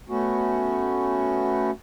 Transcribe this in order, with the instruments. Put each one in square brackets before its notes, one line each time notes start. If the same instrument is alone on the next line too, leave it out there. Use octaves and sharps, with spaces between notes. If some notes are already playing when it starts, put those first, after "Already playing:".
[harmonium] A3 B3 C#4 F#4